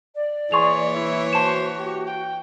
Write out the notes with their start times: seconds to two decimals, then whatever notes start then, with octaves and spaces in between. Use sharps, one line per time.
0.16 D5
0.52 E3 A#3 G#4 C#5 C6 C#6 F7
0.94 E4
1.33 F#4 C5 A5 E7
1.78 G4
2.07 G5